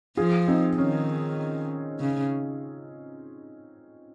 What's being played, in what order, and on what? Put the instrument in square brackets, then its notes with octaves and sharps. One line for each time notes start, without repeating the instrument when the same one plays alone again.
[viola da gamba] F3 [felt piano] F4 G#4
[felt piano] C4 D#4
[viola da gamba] D#3 [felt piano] C#4
[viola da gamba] C#3